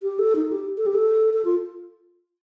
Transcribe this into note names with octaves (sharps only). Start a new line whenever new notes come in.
G4
A4
D#4
G4
A4
G4
A4
A4
F4